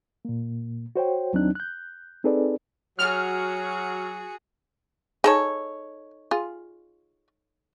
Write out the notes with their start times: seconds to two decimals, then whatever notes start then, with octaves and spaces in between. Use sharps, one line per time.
0.25 A#2 A#3
0.96 F#4 C5 C#5 G5
1.33 D#2 F#3 C4 D4 D#4 F#6
1.55 F#6 G6
2.24 C4 D#4 G#4 A4 B4 D5
2.99 F#3 F#4 G#4 F6
5.24 D#4 G#4 A4 C#5
6.31 F4 G#4